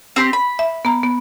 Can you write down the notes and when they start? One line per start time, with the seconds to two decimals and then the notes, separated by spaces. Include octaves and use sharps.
0.16 C4 G4 C6
0.33 B5
0.59 E5
0.85 B3 A#5
1.03 B3